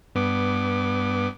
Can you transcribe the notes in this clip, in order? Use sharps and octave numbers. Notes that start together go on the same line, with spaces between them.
G2 B3 D6